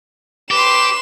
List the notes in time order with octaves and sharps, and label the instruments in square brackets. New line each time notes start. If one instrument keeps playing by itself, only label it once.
[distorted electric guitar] G4 [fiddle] B4 C6 [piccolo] D6 [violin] E7